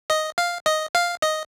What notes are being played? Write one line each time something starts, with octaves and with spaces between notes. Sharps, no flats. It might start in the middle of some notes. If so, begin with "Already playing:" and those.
D#5
F5
D#5
F5
D#5